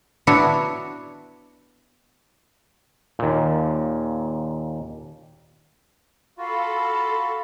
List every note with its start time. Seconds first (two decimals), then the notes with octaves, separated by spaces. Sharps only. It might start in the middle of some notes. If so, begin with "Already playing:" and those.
0.27 B3 D4 E4 F#4 C#5
3.19 D#2 A#2
6.38 F4 F#4 A4 F5 B5